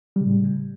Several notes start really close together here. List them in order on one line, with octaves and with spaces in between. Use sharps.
G3 C#3 A2